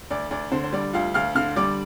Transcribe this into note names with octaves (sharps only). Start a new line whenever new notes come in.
D2 D5
D2 D5
D3 C5
C5
G3 D5
D2 F4 F5
D2 F5 F6
D3 F5 F6
G3 D5 D6